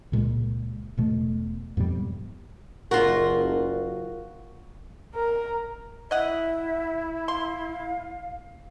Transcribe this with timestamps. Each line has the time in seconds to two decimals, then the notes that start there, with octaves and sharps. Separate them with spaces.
0.12 C#2 A#2 G#3
0.97 E1 B2 A3
1.77 F2 G#2 B2 G3
2.91 F#1 F4 F#4 A#4 C6
5.15 A#4
6.11 E4 D#5 E5 F#5
7.28 F5 C6